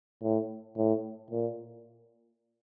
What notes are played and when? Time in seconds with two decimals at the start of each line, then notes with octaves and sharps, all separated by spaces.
0.22 A2
0.77 A2
1.31 A#2